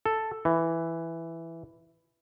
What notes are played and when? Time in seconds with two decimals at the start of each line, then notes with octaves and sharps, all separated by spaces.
0.06 A4
0.45 E3